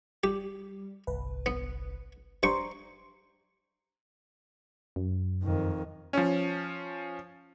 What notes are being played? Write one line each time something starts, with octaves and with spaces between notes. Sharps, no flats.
G3 G4
G1 C2 B4
B3
G2 C5 G5 A#5 C6 C#6
F#2
F2 D#3
F3 C#4